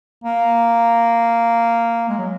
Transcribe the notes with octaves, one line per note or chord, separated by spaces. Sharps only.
A#3
G#3
F#3